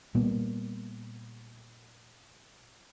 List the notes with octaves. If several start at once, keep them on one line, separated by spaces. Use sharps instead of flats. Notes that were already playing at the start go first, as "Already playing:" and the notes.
A#2 G3 A#3 B3